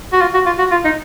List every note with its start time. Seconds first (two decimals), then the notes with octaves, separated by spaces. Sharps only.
0.13 F#4
0.21 F4
0.34 F#4
0.46 F4
0.59 F#4
0.71 F4
0.85 D#4